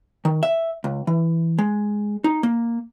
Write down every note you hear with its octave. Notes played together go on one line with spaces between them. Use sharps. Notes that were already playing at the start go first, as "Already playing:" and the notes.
D#3
E5
C#2
E3
G#3
D#4
A#3